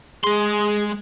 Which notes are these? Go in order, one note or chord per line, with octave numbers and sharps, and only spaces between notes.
G#3 G#4 C6